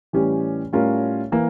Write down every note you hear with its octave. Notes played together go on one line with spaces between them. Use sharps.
A2 E3 G3 C#4 G4
A2 G3 C#4 F4 A#4
E3 A#3